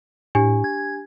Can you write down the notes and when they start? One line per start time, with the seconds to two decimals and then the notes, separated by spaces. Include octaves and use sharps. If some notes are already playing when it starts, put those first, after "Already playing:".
0.35 A2 D4 G4 G#5
0.64 G#6